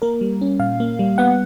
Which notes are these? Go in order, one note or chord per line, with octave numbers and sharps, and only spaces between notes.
A#3 A#4
G3
C#4
A#2 F5
A#3
G3
B3 F#5